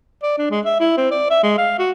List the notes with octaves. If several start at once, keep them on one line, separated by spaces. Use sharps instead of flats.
D5
D4
G#3
E5
E4
C4
D5
E5
G#3
F5
F#4